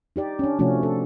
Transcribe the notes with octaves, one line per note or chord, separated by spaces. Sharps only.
D#4 G4 D5
C#4 D4
C3 F3 A3 C#4 F#4
A4